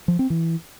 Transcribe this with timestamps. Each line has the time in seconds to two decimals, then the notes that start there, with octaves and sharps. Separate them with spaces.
0.08 F3
0.19 C4
0.30 E3